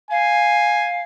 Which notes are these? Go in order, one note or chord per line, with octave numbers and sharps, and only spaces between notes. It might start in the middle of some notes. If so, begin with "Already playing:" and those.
F5 G#5